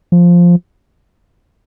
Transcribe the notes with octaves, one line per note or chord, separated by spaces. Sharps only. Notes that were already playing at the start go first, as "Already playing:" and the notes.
F3